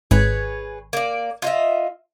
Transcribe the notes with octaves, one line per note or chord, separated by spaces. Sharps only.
G#1 G#4 B4 C#5
A#3 D5
F4 D#5 E5